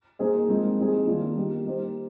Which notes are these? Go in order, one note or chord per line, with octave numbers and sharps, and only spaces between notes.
A#3 D#4 G#4 C5
F3 G#3 C4 D#4 A#4
G3 C4 D#4 G#4
D#3 G3 A#3 D4 F4
G3 A#3 D#4 G4
A#3 D#4 G4 C5